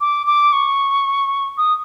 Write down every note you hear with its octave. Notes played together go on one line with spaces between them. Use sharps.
D6
D6
C#6
D#6